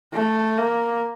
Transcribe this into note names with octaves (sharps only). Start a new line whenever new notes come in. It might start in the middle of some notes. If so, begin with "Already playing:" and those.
A3
A#3